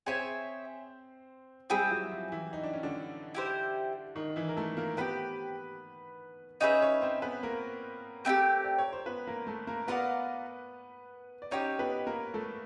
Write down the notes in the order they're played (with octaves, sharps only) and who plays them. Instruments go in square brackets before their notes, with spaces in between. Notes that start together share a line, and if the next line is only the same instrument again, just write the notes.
[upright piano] C4 C5 [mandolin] G#4 C#5 E5 G#5
[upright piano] G3 G4 [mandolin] C4 E4 G#4
[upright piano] F#3 F#4
F3 F4
E3 E4
D#4
D4
C#4
D3 D4
[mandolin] E4 G4 C5
[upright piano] D#3 D#4
E3 E4
A#4
A3 A4
A#3 A#4
[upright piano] B3 B4 [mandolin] C4 D#4 G4
[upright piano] C#4 C#5 [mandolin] D#4 G#4 B4 E5
[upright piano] C#4 C#5
C4 C5
B3 B4
A#3 A#4
[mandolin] A3 C4 E4 G4
[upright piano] D5
C#5
C5
B3 B4
A#3 A#4
A3 A4
A#3 A#4
[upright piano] B3 B4 [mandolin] F4 A#4 D5 F#5
[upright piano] D5
[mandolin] C4 D#4 G4 [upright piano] C#4 C#5
[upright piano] B3 B4
A#3 A#4
A3 A4